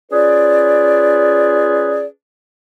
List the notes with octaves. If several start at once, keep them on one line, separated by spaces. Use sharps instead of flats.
C#4 F4 G#4 B4 D5